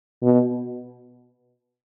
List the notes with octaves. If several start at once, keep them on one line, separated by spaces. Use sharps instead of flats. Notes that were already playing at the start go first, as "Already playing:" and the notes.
B2